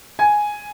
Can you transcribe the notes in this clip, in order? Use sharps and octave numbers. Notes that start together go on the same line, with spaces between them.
G#5